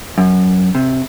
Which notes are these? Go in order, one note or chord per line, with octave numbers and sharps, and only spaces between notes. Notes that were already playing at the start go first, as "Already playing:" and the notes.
F#2
C3